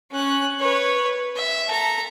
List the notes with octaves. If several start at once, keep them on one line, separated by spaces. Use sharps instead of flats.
C#4 F#6
B4 C#5
E5
A4 A#5